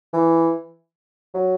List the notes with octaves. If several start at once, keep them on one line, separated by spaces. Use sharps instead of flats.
E3
F#3